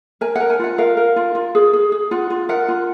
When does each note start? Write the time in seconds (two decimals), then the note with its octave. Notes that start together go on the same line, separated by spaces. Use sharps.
0.21 A#4 G#5
0.36 A#4 F#5
0.50 G#5
0.59 F4 F#5
0.78 A#4 F5
0.97 A#4
1.16 F4
1.35 F4
1.55 G#4
1.73 G#4
1.92 G#4
2.11 F4 F#5
2.30 F4
2.49 A#4 F#5
2.68 F4